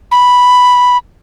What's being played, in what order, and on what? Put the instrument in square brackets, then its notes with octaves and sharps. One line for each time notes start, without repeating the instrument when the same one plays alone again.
[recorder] B5